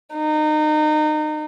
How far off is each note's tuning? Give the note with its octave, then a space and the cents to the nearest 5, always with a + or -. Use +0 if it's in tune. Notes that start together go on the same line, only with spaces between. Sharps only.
D#4 -25